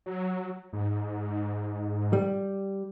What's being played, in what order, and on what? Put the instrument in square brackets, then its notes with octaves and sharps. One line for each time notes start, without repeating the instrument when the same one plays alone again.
[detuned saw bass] F#3
G#2
[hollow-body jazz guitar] G3